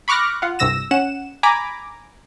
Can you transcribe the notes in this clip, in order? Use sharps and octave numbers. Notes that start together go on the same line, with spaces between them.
B5 C#6 D6 F6 F#6 A#6
F4 F#5
C2 G2 C3 E6 A#6 E7
C#4 F#5 E7
G#5 A#5 B5 D6